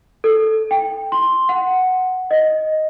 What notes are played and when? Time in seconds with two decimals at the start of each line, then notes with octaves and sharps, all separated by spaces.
0.24 A4
0.71 G5
1.12 C6
1.49 F#5
2.31 D#5